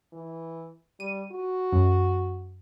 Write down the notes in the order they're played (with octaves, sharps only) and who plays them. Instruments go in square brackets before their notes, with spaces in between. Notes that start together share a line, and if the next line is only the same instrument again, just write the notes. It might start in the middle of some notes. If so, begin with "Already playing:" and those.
[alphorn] E3
[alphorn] G3 [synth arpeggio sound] D#7
[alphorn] F#4
[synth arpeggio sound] F#2